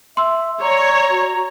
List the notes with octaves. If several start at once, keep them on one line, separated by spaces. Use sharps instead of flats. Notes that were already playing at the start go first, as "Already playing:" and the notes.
E5 C6 E6
C#5 D5 A#5
F#4